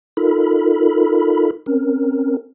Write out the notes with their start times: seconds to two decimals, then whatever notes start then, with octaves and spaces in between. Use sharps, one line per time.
0.17 D#4 F4 A4 A#4 B5
1.66 C4 C#4 A#4